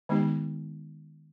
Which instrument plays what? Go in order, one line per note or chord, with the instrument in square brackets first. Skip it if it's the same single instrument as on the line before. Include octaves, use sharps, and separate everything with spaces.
[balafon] D#3 G#3 B3 D#4 G4